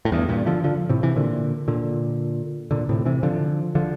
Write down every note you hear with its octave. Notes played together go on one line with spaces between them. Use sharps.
A2
E2 G2
G2 A#2
D3 F3
D3 F3
A2 C3
C3 E3
A#2 D3
A#2 D3
A#2 D3
A2 C3
C3 E3
D3 F3
D3 F3